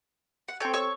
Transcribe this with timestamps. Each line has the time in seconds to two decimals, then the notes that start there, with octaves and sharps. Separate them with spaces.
0.48 F#5
0.60 C4 A4 C#5 G5
0.73 C#5 C#6 E6